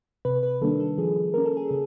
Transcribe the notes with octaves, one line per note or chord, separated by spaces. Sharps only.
C3 B4
B4
D#3 G3 A#3 D4 A4
A4
F3 G#4
A#3 C#4 A#4
A4
G#4
C#3 A4